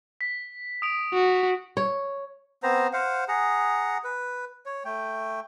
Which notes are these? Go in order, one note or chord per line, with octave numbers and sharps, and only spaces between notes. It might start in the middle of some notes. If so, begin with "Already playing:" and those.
B6
D#6 D7 F7
F#4
C#5
B3 C4 C5 A#5
C5 F5 F#5
G#4 F#5 A#5
B4
C#5
A3 G5